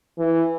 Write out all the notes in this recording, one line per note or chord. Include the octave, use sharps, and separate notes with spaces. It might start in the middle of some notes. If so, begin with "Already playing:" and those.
E3